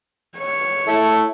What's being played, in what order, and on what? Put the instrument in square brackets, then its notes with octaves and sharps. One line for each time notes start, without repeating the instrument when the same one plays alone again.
[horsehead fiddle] C#5
[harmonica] E4 A4